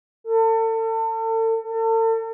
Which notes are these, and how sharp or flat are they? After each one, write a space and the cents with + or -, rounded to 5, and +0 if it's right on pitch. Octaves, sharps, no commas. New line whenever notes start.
A4 +35
A4 +40